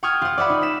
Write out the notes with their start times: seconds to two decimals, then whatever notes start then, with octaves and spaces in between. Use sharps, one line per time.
0.03 F#5 G5 C#6 D#6 F6 G#6
0.22 F4 F#5
0.38 D5 E5 F#5 B5
0.50 D#4
0.63 B6 E7